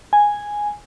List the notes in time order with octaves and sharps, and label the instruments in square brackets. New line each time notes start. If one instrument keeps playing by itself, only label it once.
[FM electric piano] G#5